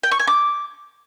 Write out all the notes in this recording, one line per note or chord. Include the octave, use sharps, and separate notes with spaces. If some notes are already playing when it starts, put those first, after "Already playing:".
G5
C#6
G#5
D6